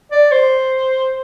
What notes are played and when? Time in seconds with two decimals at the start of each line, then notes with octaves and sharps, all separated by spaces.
0.11 D5
0.31 C5